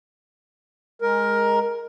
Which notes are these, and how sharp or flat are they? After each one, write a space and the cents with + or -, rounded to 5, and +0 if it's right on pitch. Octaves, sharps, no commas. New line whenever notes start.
G#3 +0 A#4 +10